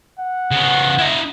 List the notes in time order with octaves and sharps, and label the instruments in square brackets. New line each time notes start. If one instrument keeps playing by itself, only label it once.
[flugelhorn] F#5
[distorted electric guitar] C#3 B3
E4 D#5